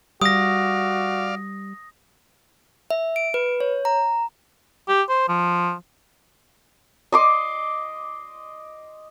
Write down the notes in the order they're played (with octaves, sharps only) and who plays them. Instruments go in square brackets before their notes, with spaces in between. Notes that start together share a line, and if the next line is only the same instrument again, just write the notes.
[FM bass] G3 [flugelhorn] F#4 [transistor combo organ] D5 F5 [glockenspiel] D#6 A#6
[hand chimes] E5
D7
B4
C#5
A#5
[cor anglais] G4
C5
F3
[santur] D#5 C6 D6